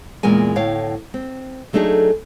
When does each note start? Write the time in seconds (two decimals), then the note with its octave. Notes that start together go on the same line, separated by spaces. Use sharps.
0.23 E2 A#2 G#3 A#4 G#5
0.56 D2 A2 C#5 F5 G5
1.14 C4
1.73 F#3 A3 D4 D#4 G#4